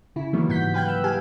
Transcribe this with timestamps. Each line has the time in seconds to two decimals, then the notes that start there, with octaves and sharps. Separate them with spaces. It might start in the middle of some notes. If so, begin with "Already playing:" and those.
0.16 C#3 E4
0.33 D#3 E3 F#3 G3 A#3 B3
0.49 G#2 F#5 G6 B6
0.74 B4 F5 G5 B5 F#6 G6
0.88 E6
1.04 G4 F5 G#5